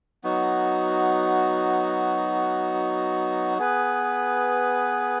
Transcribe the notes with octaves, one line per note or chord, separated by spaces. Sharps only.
F#3 B3 D#4 F#4
B3 G#4 B4